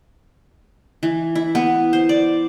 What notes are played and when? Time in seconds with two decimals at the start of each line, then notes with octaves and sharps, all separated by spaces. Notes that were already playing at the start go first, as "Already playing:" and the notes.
1.03 E3
1.35 E4
1.55 B3
1.93 C5
2.09 D5